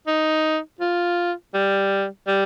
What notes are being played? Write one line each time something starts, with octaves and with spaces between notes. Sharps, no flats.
D#4
F4
G3
G3